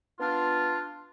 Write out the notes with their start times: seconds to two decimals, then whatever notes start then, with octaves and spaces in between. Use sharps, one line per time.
0.20 B3 D4 F4